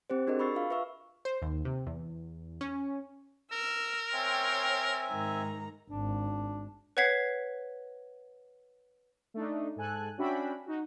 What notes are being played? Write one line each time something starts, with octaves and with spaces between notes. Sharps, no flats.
C4 G4 C5
D4 F#4 G#4 A#4 D#5
B5 C#6 E6 A6 C7
F4 F5
B4 E5 F5 C#6 E6
C5
D#2
C3
E2
C#4
A#4 E6
C4 C#5 E5 G5 G#5 C6
G#2 D#3 A#5
G#1 D4
B4 C#5 F#5 G#6 B6 C7
A3 D4 D#4
G#2 A4 G#5 F#6
C#4 D4 F#4 E5 G5 B5
D#4 F#4